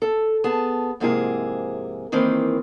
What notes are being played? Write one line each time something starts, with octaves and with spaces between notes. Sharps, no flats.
A4
B3 G#4 A5
F2 G#2 C3 A#3 E4 G#4
D#3 E3 A#3 C4